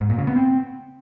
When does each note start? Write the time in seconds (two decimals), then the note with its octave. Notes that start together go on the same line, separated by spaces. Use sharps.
0.01 G#2
0.10 A#2
0.18 C#3
0.27 B3
0.36 C4